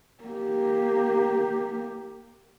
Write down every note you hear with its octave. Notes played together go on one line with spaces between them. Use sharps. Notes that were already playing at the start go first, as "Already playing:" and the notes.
A#3 G4